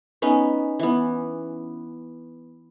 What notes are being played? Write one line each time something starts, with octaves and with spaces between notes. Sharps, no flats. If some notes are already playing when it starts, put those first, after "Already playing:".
B3 C#4 D#4 B4
E3 B3